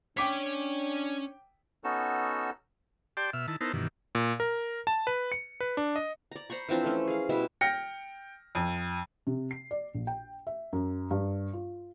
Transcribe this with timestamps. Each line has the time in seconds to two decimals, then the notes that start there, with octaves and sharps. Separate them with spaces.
0.17 C#4 D4 C#5 G5 D6 B6
1.84 B3 C#4 D#4 F#4 A4 E6
3.17 G4 D5 G5 A5 C6
3.33 B2 E5 F6
3.48 D#3 E4 A5
3.61 B3 D#4 E4 A#4 C5 A5
3.74 G2 B2 D#3 E3
4.15 A#2
4.40 A#4
4.87 A5
5.07 B4
5.32 C#7
5.60 B4
5.77 D4
5.96 D#5
6.31 D5 A#5
6.50 C5 A#5 B5 C#6
6.69 E3 F3 C4 D4
6.84 A3 C#4
7.07 G#4 F5
7.29 B2 G3 E4 E5
7.61 G5 F6 A#6 C#7
8.55 F2
9.27 C3
9.51 C7
9.71 D5
9.94 A#1
10.07 G5
10.47 E5
10.73 F#2
11.11 G2
11.53 F4